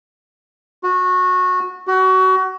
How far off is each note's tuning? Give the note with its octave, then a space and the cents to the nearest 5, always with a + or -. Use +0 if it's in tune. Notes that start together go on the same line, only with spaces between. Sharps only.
F#4 -20
F#4 +25